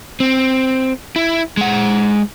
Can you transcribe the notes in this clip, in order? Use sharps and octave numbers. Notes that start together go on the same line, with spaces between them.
C4
E4
G#3 F#5